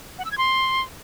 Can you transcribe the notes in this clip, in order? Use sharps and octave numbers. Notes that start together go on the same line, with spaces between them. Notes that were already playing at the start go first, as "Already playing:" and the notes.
F#5
E6
G#6
C6